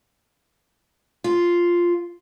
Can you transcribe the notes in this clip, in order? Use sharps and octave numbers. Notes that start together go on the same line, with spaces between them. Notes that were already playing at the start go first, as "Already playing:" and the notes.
F4